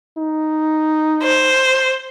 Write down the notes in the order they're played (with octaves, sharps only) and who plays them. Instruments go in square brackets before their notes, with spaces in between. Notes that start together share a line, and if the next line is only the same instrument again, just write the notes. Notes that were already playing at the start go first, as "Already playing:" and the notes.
[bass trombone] D#4
[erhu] C5